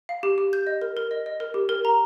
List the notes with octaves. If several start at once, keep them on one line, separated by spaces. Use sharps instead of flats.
F5
G4
G4
G6
D#5
A#4
A#4
D#5
D#5
A#4
G4
A#4
A#5